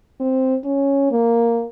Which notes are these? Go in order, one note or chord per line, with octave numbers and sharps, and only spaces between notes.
C4
C#4
A#3